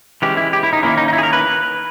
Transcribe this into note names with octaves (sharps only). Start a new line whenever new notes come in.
E3 G#3 C#4 G4
E4
G4
E4
D#4
D#3 A#3 C#4 E4
D#4
D#4
E4
G#4
A#4
B4